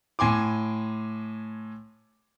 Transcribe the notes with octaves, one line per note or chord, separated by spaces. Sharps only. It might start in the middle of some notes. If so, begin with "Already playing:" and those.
A2 G#5 C6 D6